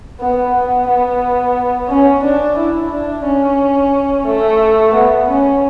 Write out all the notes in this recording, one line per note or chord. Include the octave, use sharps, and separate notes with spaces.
B3
B3
B3
C#4
D4
E4
D4
C#4
A3
B3
C#4